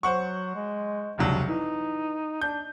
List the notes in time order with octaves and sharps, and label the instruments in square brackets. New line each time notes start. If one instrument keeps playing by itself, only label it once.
[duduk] F#3 [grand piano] C5 F#5 C#6
[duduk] G#3
[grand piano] F1 C#2 F#3 [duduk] D4
[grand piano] E3 [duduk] D#4
[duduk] D4 [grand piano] G6